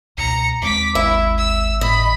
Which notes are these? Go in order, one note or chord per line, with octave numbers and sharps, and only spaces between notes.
C#2 B2 A#5 C#7
D#2 G#3 C4 D6 B6
G#1 E4 E5
E6
A2 D#5 B5